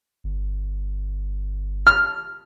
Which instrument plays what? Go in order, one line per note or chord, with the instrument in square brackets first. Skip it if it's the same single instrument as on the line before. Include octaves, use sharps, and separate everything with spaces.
[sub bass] G1
[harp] F6